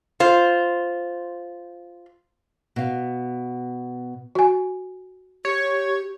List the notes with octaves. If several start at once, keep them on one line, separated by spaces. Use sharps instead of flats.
F4 C5
B2 F5
F#4 G#5
G4 C#5